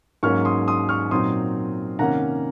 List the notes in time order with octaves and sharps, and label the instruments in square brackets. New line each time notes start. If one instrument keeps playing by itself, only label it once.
[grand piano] G#2 F#3 A#3 C#4 C#6 F6
C6 D#6
C6 D#6
C#6 F6
A#2 F#3 C4 D#4 C6 D#6
C3 D#3 A#3 C#4 F#5 A#5